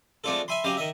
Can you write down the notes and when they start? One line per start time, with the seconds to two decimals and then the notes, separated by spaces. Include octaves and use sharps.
0.24 G#3 A3 C4 D4 F4 A4
0.48 E5 G#5 B5 C6
0.64 C#3 F#3 G4 D#5 F5
0.77 D#3 D#5 E5